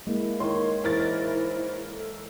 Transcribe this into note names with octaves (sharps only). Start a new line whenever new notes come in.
G#3 A#3 E4
D#3 C#5 C6
G#2 E3 E4 A#4 A6
A4